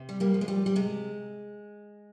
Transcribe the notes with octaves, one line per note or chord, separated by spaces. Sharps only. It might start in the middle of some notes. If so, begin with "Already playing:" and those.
Already playing: C3
G3
G3 A#3
F3
G#3
G3
G3
C3 G#3